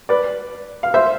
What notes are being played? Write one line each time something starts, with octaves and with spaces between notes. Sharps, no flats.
B4 D5
F5
C5 E5